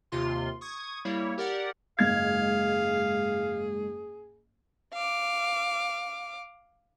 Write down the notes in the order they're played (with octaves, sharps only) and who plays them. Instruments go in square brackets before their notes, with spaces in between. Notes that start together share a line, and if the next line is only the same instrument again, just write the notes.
[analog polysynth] D#2 C3 F4 C6
C#6 D#6 G#6
G3 A#3 E4 C#5
G4 A#4 D5 F#5
[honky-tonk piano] F#1 G#2 G#6 [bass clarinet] G#4 [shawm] F5
[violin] F5 D6